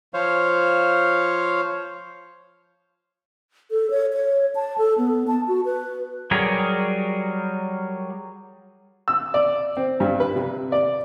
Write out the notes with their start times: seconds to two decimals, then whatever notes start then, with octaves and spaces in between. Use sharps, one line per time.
0.14 F3 C5 C#5 F5
3.71 A4
3.90 C#5
4.13 C#5
4.55 A5
4.78 A4
4.98 B3
5.27 A5
5.48 F#4
5.65 B4
6.31 F#3 G3 G#4 A#4 C#5
9.08 E6
9.34 D5
9.77 C4
10.00 G2
10.20 B4
10.36 C3
10.72 D5